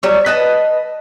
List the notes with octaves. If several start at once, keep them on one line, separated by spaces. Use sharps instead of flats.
F#3 G3 C#5
B4 D#5 A5